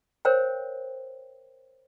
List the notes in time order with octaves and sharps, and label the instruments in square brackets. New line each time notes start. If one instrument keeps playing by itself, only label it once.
[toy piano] A#4 C5 C#5 F5 G5